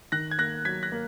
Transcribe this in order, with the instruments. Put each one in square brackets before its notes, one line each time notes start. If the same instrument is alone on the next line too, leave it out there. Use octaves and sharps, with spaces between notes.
[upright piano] D#3 [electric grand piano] F#6 A#6
[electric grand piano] G#6
[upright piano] A#3 [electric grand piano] F#6 A#6
[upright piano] F#3 [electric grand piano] G#6 B6
[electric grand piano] F#6 A#6
[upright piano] A#3